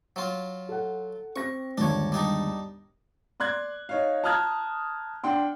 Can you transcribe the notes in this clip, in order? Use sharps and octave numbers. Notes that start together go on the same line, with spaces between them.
F#3 F4
A4 F#5
C4 G4 C#6 A#6
G1 D#2 G#2 D4 C#5
G3 D4 D#4
D5 C6 F#6 G#6
D#4 C#5 F5
A5 A#5 D#6 F6 F#6 G#6
D4 F#5 G5 C6